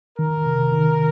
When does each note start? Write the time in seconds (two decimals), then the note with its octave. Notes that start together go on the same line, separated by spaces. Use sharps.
0.18 D#3 A#4
0.46 C3
0.72 D#3